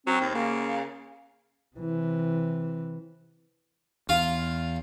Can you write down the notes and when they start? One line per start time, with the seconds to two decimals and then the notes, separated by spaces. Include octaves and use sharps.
0.07 F#3 C4
0.21 D#2
0.35 C#3 A#3
1.77 C3 E3
4.09 E2 F4